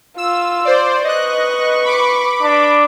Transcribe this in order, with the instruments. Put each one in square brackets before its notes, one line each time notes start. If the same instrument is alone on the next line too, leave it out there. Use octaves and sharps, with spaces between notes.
[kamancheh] F4 [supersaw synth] E6
[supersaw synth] C5 D5
[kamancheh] B4 C#6 [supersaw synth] D#5 F#6
[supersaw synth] B5 D6
[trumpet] D4